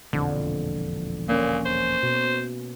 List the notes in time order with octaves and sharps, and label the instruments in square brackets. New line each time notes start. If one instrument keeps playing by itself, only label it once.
[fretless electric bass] E1 A#1 F2 [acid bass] D3
[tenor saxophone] A#2 [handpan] A#3 C#4
[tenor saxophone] C5
[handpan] B2